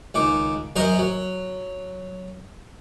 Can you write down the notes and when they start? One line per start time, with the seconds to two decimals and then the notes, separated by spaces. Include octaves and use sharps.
0.14 C#2 D#3 D6
0.76 F#2 F#3 A#4 C5 D#5
0.99 F#3